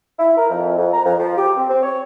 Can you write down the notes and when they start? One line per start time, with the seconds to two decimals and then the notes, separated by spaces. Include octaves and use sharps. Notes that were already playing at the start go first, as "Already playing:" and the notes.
0.19 E4
0.37 A#4
0.50 F2
0.77 F2
0.94 A#5
1.06 F2
1.20 F3
1.37 G4
1.57 C4
1.69 C4
1.83 C#5